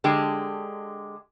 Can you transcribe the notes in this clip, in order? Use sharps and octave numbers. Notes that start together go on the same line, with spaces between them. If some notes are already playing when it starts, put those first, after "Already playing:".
D3 G#3 G4